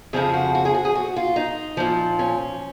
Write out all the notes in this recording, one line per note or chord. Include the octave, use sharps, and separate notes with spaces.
F2 C#3 F3 G#4
F#4
F#4
G#4
F#4
G#4
F#4
F4
D#4
A#2 F3
C#4